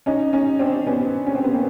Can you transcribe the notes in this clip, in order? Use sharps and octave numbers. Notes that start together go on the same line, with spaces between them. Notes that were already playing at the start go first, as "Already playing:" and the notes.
C#4 D#4
C#4 D#4
C4 D4
B3 C#4
C#4
C4
B3
A#3 C4